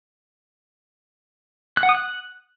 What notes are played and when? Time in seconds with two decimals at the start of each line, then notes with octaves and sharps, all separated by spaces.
1.77 F#6
1.83 F#5
1.89 D#6
1.95 F#6